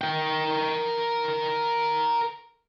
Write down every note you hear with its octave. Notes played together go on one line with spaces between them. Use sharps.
A#4 G5